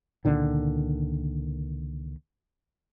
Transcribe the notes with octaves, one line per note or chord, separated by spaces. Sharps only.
C#2 A#2 D3 D#3